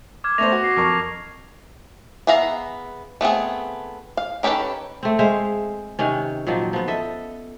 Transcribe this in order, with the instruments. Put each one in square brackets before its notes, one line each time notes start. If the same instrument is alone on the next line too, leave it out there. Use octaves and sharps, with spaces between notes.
[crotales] D6 F6 G#6
[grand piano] A3 B3 C5 [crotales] C#6 A#6 F7
[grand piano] F#4
[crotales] A#6 C7
[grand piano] F2 A#4 C#6
[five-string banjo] B3 G#4 E5 F5 A#5
A3 B3 C4 G#4
F5
D#3 C#4 G4 A4 B4
[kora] A3 C4
G#3 C5 E5 F5
C3 D#3 C#4
A#2 D#3 F3 F#3
F3 B3
A4 D#5 E5